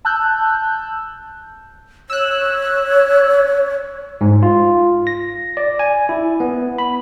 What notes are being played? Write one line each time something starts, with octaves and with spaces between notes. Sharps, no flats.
A5 E6 F#6 G6
C#5 E6 F#6
G#2
F4
A#6
D5
G#5
E4
B3
B5